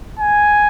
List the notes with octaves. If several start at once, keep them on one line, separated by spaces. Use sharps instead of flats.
G#5